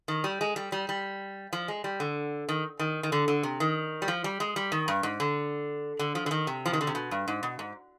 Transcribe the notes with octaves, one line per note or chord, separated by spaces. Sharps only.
D#3
G3
G#3
G3
G3
G3
F3
G#3
G3
D3
D#3
D#3
D#3
D3
D3
C3
D#3
G3
F3
G3
G#3
G3
D#3
G2
G#2
D3
D3
F3
D3
D#3
C3
F3
D#3
D3
C3
B2
G2
G#2
B2
G#2